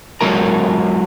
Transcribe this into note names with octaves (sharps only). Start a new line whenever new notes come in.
F#3 G#3 E4 A#4 A#5